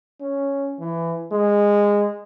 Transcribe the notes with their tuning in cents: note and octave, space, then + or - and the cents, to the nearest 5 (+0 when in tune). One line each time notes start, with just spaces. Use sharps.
C#4 +0
E3 +20
G#3 -20